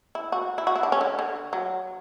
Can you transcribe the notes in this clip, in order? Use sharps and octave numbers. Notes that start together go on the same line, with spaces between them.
E4
F#4
E4
F#4
E4
D4
C#4
D3
D3
F#3